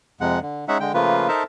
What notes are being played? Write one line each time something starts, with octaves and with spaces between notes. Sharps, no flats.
F2 C3 G#3 F#5
D3
G#3 C#4 D#4 E5 F#5
D3 G#3 G5
C#3 F3 A3 A#3 F4 B4
D#4 A4 A#4 C5 E5 A5